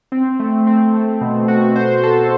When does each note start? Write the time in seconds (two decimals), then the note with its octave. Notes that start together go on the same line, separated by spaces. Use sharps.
0.12 C4
0.40 A3
0.67 C4
0.93 A3
1.21 B2
1.48 F#4
1.76 C5
2.03 A4